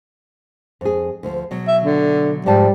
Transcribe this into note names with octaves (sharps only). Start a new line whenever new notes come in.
F2 G#4
D2 F3
B2 F#3
E5
D3
G#2 F3 G3 A5